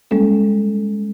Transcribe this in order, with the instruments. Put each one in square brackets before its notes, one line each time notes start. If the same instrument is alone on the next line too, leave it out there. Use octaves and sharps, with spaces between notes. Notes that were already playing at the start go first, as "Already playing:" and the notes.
[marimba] G3 G#3 A#3 C#4 A4